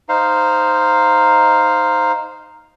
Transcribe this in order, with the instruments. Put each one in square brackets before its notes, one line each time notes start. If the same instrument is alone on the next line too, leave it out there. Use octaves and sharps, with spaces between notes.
[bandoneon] D#4 C5 F5